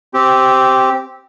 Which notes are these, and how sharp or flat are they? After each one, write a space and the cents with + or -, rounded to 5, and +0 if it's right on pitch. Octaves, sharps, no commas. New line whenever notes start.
C4 +0 G4 -10